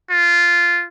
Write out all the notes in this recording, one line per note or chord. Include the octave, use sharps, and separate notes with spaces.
F4